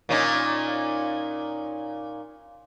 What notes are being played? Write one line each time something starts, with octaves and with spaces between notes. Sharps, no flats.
A#2 C#4 D#4